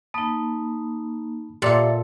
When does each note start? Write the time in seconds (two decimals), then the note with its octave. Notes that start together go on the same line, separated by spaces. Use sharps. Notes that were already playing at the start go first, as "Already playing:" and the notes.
0.14 A#3 D#4 A5 B5 D#6
1.62 A#2 G4 A4 D5 E5